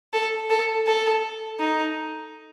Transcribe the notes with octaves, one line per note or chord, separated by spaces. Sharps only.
A4
A4
A4
D#4